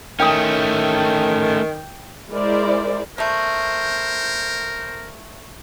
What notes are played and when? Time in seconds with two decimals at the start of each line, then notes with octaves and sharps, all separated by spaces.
0.20 D#3 A3 C#4 G5 D#6
2.30 G#3 E4 A#4 C5 D5
3.18 G3 A3 A#4 C5 G6